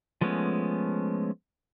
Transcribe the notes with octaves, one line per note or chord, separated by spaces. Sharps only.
F3 G#3 A3 B3 C#4